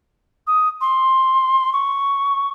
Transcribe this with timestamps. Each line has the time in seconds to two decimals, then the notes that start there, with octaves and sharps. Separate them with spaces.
0.47 D#6
0.81 C6
1.73 C#6